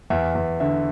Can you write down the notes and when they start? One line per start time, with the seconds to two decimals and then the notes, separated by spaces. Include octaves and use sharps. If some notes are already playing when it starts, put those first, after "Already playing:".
0.10 E2 E5
0.35 E2
0.60 D3 E5